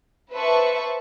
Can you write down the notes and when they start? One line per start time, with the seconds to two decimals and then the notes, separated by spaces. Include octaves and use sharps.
0.32 B4 C5 E5 A5 C#6